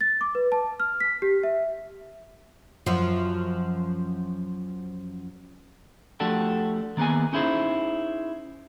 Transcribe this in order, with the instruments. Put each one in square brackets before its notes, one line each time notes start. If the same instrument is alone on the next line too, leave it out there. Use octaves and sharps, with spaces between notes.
[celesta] A6
D6
B4
A5
F6
B6
G4
E5
[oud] F#2 F3
[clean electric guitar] F3 A3 D4 F#4 G4 A4
D#3 A#3 B3 G#4 G#5
C#4 D#4 E4 G#4 C5